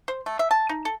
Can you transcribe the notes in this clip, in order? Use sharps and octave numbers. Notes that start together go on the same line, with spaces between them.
C5
A3
E5
A5
D#4
A4